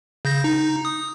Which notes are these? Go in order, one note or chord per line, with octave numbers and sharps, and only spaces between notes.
C#3 G6 A#6
D#4
D#6